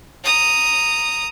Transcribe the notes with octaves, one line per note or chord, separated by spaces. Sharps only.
A#5 D#6